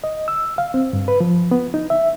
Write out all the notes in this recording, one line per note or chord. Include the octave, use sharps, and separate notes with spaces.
D#5
E6
F5
C4
G2
B4
F3
B3
D#4
E5